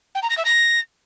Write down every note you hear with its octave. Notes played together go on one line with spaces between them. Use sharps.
G5
A#5
A#6
E5
A#6